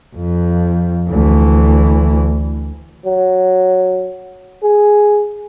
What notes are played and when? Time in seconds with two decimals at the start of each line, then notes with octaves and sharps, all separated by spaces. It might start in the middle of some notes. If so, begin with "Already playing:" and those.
0.16 F2
1.10 D2 E3
3.06 F#3
4.63 G#4